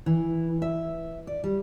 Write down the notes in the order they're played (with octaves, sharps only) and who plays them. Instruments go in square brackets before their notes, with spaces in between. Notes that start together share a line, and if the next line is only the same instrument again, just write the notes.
[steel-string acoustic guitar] E3
E5
D5
G3